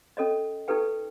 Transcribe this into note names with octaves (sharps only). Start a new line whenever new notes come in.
C#4 A4 C#5 D#5
D#4 G4 A4 B4 G5